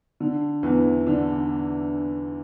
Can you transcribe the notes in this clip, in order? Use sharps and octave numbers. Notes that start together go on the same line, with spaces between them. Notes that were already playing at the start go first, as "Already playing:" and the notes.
D3
E2 E3
D3 D4